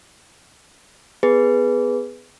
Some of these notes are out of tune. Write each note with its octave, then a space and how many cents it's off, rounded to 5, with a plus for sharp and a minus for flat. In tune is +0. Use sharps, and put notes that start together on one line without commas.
B3 +15 G#4 +0 B4 +0